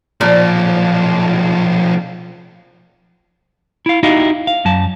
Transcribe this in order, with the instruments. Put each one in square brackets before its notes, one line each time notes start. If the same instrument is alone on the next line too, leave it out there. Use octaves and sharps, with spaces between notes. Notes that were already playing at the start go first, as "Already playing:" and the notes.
[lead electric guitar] B1 F3 [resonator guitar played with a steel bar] A#2
[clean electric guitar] E4 F5
D#4 E4 F#4 G4 D#5 F5
F5
F#2 F#3 A5